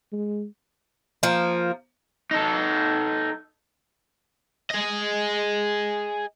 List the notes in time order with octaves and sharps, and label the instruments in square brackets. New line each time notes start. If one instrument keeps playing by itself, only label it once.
[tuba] G#3
[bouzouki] F3 A#3
[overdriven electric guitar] D#4 A4
G#4 D#5